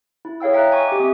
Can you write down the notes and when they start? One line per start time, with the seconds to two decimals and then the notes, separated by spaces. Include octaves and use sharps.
0.25 E4
0.40 G#4 C#5 F5 G5 E6
0.53 E5 G5 A#5 F#6
0.71 D#5 G#5 C#6
0.88 G4 D6
1.00 C4 E5 D#6